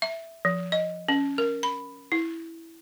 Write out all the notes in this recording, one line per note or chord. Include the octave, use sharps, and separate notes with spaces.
E5
F3
D#5
C#4
A#4
B5
E4